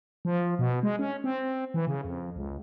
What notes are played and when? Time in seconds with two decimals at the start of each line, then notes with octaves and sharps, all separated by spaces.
0.25 F3
0.59 B2
0.83 G#3
0.99 C#4
1.24 C4
1.74 E3
1.87 C#3
2.05 F2
2.36 C#2